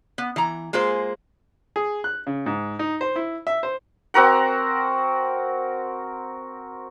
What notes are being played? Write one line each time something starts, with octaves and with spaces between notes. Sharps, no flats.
B3
E3 A#5
G#3 A#3 F4 G#4 C5
G#4
F#6
C#3
G#2
D#4
C5
E4
E5
C5
C4 F#4 A#4 F#5